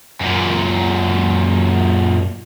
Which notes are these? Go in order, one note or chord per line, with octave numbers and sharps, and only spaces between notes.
F#2 A#2